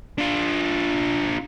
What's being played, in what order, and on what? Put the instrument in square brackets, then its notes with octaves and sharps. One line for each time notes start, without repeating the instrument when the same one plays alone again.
[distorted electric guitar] D4 F4